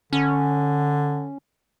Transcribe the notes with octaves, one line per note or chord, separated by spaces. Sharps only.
D3 C#4